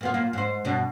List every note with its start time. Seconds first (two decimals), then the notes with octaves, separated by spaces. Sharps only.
0.01 A#2 B3 F4
0.14 A#2 A#3 F4
0.33 G#2 C5
0.64 G2 B2 D4